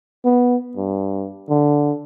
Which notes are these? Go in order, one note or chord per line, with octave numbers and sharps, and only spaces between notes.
B3
G2
D3